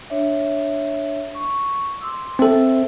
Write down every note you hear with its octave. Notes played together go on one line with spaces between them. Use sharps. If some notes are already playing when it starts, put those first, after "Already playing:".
D4 C#5 E5
C#6
C6 D6 E6
C4 A4 C5 E5